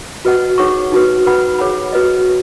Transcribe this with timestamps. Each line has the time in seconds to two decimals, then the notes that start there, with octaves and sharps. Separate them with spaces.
0.25 F#4 B4 D#5 F#5
0.58 D#4 G#4 C#5 F#5 C#6
0.92 D#4 F#4 B4
1.26 B4 F#5 B5
1.59 G#4 C#5 F#5 B5
1.92 F#4 B4 D#5